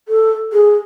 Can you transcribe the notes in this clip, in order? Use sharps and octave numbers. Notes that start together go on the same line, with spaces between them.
A4
G#4